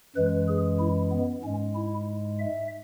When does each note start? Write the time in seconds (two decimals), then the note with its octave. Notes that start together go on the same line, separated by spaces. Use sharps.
0.16 F#2 E3 G#3 B4
0.48 G#4
0.79 E4
1.12 B3
1.44 G#2 G#3 C#4
1.75 E4
2.39 E5